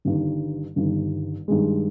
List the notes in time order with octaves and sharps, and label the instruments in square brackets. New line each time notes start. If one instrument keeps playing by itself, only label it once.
[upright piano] G1 G2 D#3
G1 G2 D#3
G2 D#3 G#3